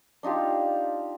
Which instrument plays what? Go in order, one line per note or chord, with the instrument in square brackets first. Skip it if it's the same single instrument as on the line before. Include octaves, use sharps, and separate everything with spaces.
[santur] D4 D#4 F4 G4